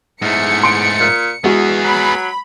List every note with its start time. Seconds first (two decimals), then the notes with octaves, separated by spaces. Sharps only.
0.22 E2 G#2 A3 C#7
0.63 C6 D7
1.00 A#2
1.44 E2 G#3 B3 F#4 G#4
1.84 F#3 B5